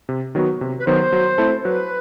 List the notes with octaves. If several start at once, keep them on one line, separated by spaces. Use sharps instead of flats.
C3
D#3 F#3 B3 F#4
C3
B4
D#3 F#3 B3 F#4 C5
F#3
A3 C4 E4 A4
F#3 B4